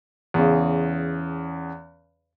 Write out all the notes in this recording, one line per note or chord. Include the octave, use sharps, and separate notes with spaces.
E2 C#3